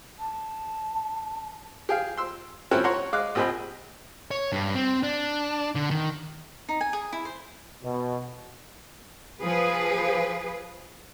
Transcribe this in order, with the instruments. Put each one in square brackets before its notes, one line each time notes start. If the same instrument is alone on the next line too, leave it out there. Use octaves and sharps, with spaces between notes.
[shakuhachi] A5
[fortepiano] G4 G#4 F5
C6 E6
C4 C#4 E4 F#4 G4 A4
C#5 F#5 A#5 C6
G#3 F5 D6 F#6
A#1 C4 G4 G#4 D#5 B5
[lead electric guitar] C#5
G2
C4
D4
D3
D#3
[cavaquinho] D#4
G#5
G#4
E4
C5
[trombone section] B2
[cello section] F3 G#4 B4